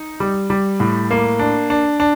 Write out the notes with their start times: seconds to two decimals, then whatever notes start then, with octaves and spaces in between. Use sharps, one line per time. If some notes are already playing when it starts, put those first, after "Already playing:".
Already playing: D#4
0.20 G3
0.50 G3
0.80 A2
1.11 A#3
1.39 D4
1.70 D4
2.00 D4